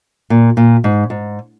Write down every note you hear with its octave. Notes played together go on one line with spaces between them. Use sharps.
A#2
A#2
G#2
G#2